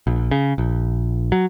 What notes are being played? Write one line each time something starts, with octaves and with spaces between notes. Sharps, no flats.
A#1
C#3
A#1
F#3